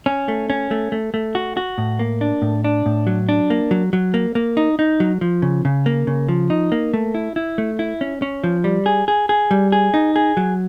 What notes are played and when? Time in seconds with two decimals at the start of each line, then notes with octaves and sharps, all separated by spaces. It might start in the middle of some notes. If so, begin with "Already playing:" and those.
0.06 C#4
0.28 A3
0.50 C#4
0.71 A3
0.92 A3
1.14 A3
1.35 F#4
1.57 F#4
1.78 A2
1.99 A#3
2.21 D4
2.42 A2
2.64 D4
2.86 A2
3.07 F#3
3.29 D4
3.50 A#3
3.71 F#3
3.93 F#3
4.14 A#3
4.35 A#3
4.57 D#4
4.79 D#4
5.00 F#3
5.21 F3
5.42 C#3
5.65 C#3
5.86 A#3
6.07 C#3
6.29 F3
6.50 D#4
6.72 A#3
6.94 A3
7.15 E4
7.36 E4
7.58 A3
7.79 E4
8.01 C#4
8.22 C#4
8.44 F3
8.64 G3
8.86 G#4
9.08 G#4
9.29 G#4
9.51 G3
9.72 G#4
9.94 D#4
10.16 G#4
10.37 F#3